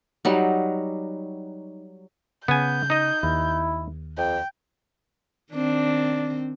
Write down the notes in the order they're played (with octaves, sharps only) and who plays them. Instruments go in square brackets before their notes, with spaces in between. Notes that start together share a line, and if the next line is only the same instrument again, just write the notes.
[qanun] F#3 G3 D#4
[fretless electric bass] C#3 [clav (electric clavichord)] B3 G#5 [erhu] G6
[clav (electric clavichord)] D#4 D#5
[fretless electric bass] D#2 [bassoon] E4
[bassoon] F2 [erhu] G5
[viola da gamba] D#3 C4 [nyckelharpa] D4